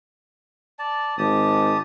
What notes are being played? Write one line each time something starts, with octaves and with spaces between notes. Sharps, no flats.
D5 A5
G#1 G4 A5 D#6